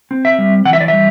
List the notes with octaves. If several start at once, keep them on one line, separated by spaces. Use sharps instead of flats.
C4
E5
G3
E3 F#5
E5
D5
G3 E5